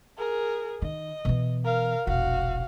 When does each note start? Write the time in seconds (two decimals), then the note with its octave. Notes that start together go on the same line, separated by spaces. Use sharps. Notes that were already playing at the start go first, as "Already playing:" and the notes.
0.18 G#4 A#4
0.82 D#3 D#5
1.25 B2 E3
1.64 A#4 F5
2.07 E1 A#1 F#4 F5